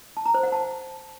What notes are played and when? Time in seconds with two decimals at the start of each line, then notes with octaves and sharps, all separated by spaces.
0.17 A5
0.26 A#5
0.34 C5
0.43 F#5
0.52 A5